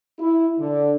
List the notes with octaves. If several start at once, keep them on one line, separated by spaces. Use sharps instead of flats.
E4
D3